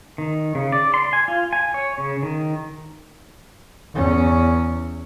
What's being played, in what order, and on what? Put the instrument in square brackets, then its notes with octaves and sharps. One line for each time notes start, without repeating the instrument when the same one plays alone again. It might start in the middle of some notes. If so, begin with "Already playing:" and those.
[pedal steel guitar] D#3
C#3
D5
C6
G#5
F4
G#5
C#5
C#3
D#3
[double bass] E2 C#4